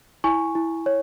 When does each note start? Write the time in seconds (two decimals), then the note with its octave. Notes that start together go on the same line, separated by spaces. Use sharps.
0.24 E4 G#5 C#6
0.55 E4
0.86 C#5